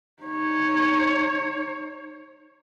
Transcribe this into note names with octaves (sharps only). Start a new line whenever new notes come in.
D#4 C#5